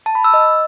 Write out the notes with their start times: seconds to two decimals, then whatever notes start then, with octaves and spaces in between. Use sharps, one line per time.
0.06 A5
0.15 B5
0.24 E6
0.34 D#5